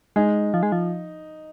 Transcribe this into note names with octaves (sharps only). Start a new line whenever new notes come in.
G#3 D#4
F3
G#3
F3